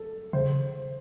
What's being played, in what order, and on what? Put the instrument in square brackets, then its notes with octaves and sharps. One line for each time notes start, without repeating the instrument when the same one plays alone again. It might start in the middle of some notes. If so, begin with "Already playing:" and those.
Already playing: [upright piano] A4
[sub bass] C#3 [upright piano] C5